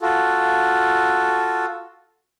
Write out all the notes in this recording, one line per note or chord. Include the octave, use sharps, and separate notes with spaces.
F4 F#4 A4